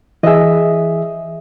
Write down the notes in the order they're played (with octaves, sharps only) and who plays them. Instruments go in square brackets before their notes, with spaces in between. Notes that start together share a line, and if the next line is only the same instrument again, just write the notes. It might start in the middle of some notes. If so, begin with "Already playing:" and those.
[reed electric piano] E3 G#4 [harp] D#5 E5